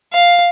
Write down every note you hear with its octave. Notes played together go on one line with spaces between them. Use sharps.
F5